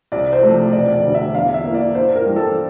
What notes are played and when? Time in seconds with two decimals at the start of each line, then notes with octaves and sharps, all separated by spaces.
0.12 C2 D5
0.33 C5
0.43 C3 F3 A3
0.72 E1 D5
0.94 D5
1.03 D2 D3
1.14 E5
1.34 E2 F5
1.54 E5
1.64 A#3
1.69 E3 D5
1.95 G2 C5
2.16 A#4
2.26 E3 G3 D4
2.36 A4